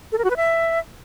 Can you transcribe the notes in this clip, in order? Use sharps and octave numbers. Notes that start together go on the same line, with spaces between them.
A4
A#4
F#4
B4
E5